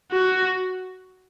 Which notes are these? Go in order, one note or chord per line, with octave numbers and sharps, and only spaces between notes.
F#4